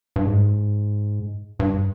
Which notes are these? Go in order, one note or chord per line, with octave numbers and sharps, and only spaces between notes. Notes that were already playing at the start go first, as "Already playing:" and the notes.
G2
G#2
G2